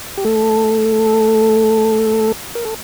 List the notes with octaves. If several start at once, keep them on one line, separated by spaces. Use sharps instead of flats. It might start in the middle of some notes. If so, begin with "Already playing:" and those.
G4
A3 A4
A#4
A4